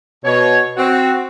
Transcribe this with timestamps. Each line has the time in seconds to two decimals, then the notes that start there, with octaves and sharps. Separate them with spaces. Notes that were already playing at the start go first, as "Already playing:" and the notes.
0.25 B2 C#5
0.77 C4 F#4